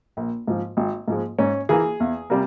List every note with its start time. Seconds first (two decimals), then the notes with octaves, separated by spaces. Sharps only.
0.17 A#1
0.47 G#2 F3
0.77 G#1
1.08 G#2 F3 G#3
1.39 G#2 C#4
1.69 E3 A#3 G#4
2.00 E2
2.30 C3 G3 A#3